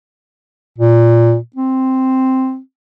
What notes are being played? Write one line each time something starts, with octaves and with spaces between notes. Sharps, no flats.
A#2
C4